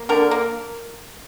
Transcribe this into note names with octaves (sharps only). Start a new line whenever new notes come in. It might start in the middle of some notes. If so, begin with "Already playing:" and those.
Already playing: A#3
D3 A#4
A#3